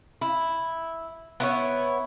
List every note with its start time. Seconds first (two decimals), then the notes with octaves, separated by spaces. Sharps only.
0.21 E4
1.40 B3 E4 C#5